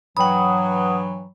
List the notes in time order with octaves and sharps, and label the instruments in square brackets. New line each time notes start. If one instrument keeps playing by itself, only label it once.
[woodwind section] G2 E3 F#3 [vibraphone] F#5 D#6 [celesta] G5 B5